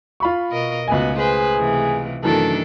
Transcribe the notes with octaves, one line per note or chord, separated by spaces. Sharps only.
F4 B5 C#6
B2 A#4 D#5
C#2 A3 B3 F#4 G#5
G#4 B4 C5
C3 E3 A3
F#2 D#3 E3 A3 D4 A4 A5